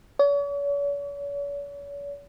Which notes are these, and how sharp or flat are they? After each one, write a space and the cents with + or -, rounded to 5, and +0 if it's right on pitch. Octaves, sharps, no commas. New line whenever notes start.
C#5 +45